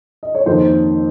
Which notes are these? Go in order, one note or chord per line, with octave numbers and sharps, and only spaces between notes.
D#5
C#5
F2 D#3 A#3 C5